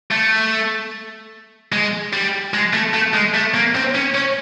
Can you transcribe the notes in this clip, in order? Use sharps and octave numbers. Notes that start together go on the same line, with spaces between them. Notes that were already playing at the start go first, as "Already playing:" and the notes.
A3
G#3
G3
G#3
A3
A3
G#3
A3
A#3
C4
C#4
C#4